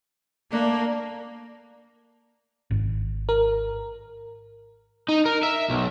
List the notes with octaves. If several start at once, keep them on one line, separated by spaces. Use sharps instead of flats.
A3 A#3 D4
G#1
A#4
D#4
A#4
E5
B1